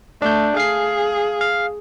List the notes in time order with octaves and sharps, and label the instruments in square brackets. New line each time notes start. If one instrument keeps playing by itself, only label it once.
[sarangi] A3 [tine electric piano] D4 G6
[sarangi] G#4 [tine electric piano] F5 C7
[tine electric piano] F5